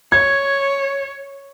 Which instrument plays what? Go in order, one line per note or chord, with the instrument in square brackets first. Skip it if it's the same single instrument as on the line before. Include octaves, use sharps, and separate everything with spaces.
[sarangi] C#5 [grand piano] G#6